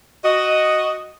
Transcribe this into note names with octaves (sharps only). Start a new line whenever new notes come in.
F#4 D#5